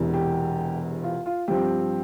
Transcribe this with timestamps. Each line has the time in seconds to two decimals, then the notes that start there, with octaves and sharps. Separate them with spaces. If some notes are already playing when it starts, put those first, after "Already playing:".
Already playing: E1 E2 C3
0.14 G4
1.03 F4
1.26 F4
1.48 G2 F3 C4 G4